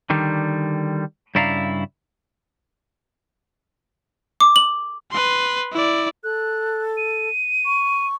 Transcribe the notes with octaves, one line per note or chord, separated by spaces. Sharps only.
D3 D#3 G3
G2 C#3 E4 D5 F5 A#5
D6
F#7
B4 C6
E4 D5
A4 F#6
D#7
C#6